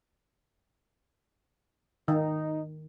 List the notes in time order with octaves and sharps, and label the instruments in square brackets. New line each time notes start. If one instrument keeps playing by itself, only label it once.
[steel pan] D#3 [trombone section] D#4